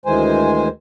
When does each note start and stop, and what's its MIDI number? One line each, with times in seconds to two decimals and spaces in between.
0.06 0.68 38
0.06 0.68 51
0.06 0.68 52
0.06 0.68 56
0.06 0.68 72
0.06 0.68 80